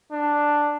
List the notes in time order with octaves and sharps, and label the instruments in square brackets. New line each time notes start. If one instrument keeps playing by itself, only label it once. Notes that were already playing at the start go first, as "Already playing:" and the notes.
[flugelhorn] D4